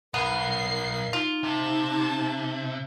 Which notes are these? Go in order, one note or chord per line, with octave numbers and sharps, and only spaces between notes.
B1 B3 A#4 C7
D#4 F4
C3 A5